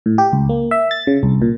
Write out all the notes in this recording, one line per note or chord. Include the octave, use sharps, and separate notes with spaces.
A2
G4
C#2
A#3
E5
A6
C#3
C2
A#2